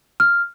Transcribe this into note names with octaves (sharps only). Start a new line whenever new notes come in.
F6